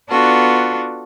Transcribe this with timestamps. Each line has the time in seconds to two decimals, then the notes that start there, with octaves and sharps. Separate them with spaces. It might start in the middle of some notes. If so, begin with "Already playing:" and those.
0.10 B3 D4 F4 F#4 A4